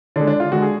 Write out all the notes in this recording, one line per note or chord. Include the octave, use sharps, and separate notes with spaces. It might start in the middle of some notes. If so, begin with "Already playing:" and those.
D3 G#3 D4
D4
F4
D3 G#3 F#4
G#4